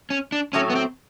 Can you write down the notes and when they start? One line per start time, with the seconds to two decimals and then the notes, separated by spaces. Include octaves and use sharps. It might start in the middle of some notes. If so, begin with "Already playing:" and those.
0.10 C#4
0.32 D4
0.53 A2 F#3 A3 C#4
0.70 B3
0.75 C4